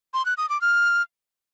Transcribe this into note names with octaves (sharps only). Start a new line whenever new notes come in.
C6
F#6
D#6
D6
F6